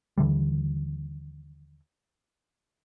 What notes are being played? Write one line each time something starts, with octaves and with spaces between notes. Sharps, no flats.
D#2 D3 E3 G3